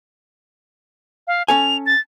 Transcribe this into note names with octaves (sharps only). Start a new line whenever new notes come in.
F5
C#4 A4 G#5 F7
A6